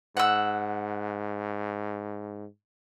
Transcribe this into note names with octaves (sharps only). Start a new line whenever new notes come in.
G#2 F#5 E6